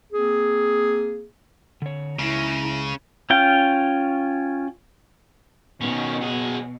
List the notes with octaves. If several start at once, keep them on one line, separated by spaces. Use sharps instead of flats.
A#3 C4 G#4
D3 C#5
C#2 C#3 E4 A#5
C#4 F4 G5
B2 D#3 C#4
F#3 G#4